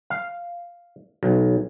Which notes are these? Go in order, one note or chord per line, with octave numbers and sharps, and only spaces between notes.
F5
B1